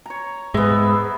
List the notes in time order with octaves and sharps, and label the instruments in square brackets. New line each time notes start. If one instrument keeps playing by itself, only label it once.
[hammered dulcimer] C#5 A#5
[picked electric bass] G#2 G#3 [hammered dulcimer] B3 E5